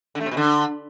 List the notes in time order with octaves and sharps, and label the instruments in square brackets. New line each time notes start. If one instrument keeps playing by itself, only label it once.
[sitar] D3
A3
C3
B2
D3